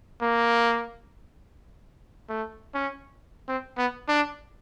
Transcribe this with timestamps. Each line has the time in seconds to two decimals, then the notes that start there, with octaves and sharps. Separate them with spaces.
0.22 A#3
2.29 A3
2.74 C#4
3.48 C4
3.78 B3
4.08 D4